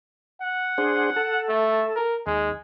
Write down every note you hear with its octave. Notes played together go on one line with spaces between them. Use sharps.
F#5
D4 G#4 C5
A4
A3
A#4
D#2 G#3